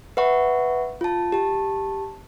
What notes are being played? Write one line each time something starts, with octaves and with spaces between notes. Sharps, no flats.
B4 E5 F#5 C#6
F4 A5
G4 A5